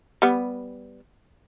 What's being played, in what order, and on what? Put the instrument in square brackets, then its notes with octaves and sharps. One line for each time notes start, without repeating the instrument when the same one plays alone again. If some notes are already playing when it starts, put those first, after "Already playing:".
[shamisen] G3 B3